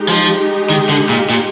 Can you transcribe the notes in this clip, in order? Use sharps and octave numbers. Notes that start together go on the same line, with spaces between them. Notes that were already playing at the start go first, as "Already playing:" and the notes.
Already playing: G#3 D#4 G4
F3
D#3
D3
A#2
A#2